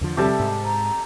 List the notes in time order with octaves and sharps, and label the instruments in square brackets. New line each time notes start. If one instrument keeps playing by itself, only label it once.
[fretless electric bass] E2 D3 F3
[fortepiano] C3 G3 [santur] G4 A4 A5 [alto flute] E5
[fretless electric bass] G#2
[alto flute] A#5